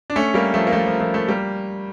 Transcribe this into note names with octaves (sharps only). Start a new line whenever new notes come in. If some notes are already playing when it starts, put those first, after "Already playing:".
D4
A3 C#4
G3 A#3
F3 A3
A#3
F3 A3
F3
F3 A3
F3 A3
G3 A#3